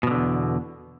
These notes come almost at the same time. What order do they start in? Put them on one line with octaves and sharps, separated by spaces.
B2 F3 D3 E2